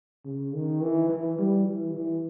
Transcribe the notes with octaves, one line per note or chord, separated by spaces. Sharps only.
C#3
D#3
E3
E3
G3
E3
E3